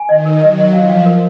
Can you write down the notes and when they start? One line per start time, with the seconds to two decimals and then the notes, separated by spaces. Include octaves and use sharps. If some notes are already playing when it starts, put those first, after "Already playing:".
Already playing: G#5
0.09 D#3 D#5
0.26 A#4
0.42 F#3 D#5
0.58 D#5
0.73 F3 F5
0.89 F5
1.06 A#4